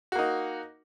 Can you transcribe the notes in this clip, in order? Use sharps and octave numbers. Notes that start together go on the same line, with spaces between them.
A#3 D#4 F#4